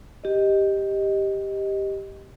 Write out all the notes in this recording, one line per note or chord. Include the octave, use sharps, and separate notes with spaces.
G4 D#5